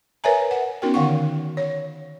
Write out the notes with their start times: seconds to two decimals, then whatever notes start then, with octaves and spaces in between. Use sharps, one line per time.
0.24 A#4 B4 C#5 E5 G#5 A#5
0.51 F#5
0.82 B3 C#4 D#4 F#4 A#4 G5
0.94 D3 D#3 F5 F#5 C#6
1.57 C#5